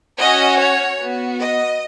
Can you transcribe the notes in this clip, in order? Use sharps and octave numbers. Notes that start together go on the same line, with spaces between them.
C#4 F#4 D#5
C#5
B3 F#4
D#5